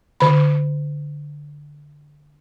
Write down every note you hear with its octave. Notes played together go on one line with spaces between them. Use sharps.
D3 B5